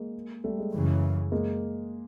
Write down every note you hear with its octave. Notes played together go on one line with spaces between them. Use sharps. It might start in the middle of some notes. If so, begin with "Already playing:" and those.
Already playing: G#3 A#3
G3 A3
G#3
F#2 C#3 E3
G#3 A#3